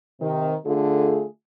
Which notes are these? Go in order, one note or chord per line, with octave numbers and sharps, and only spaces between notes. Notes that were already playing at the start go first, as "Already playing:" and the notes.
C3 D#3
D3 A3 F4 G#4